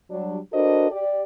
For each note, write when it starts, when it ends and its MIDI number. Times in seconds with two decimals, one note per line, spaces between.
0.10 0.38 54
0.10 0.38 55
0.10 0.38 62
0.53 0.91 62
0.53 0.91 66
0.53 0.91 69
0.53 0.91 70
0.53 0.91 72
0.53 0.91 75
0.91 1.22 67
0.91 1.22 74